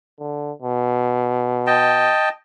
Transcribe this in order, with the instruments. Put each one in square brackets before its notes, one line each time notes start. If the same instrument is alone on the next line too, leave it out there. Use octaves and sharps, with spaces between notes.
[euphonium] D3
B2
[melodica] D#5 G5 A5